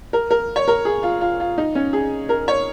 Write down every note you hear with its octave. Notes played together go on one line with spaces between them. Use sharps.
A#4
A#4
C#5
A#4
G#4
F4
F4
F4
D#4
C#4
G#4
A#4
C#5